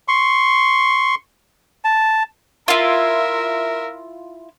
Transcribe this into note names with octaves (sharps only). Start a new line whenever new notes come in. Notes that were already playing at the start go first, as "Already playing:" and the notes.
C6 C#6
A5
E4 F4 A#4 E5